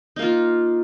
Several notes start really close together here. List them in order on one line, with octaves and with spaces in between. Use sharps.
D#4 A#3 F4